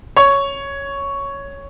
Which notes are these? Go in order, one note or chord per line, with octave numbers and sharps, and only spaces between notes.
C#5 C#6